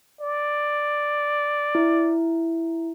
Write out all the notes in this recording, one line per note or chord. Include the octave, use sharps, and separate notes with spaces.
D5
E4